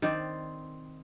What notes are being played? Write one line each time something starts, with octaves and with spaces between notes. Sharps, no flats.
D#3 C4 C5 D5